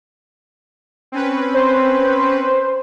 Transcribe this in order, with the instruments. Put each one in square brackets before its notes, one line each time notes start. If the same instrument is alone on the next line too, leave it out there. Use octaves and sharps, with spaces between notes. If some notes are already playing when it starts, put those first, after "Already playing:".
[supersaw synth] C4 C#4 B4
[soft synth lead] C5